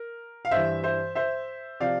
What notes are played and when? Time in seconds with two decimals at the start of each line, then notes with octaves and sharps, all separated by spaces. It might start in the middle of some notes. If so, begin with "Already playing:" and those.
Already playing: A#4
0.45 F5
0.51 G2 E3 C5 E5
0.84 C5 E5
1.15 C5 E5
1.80 C3 F3 D5 F5